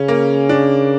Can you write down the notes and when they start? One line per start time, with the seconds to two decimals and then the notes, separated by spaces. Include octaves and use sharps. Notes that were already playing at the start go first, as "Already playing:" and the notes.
Already playing: C#3 C#4
0.08 A#3
0.49 D4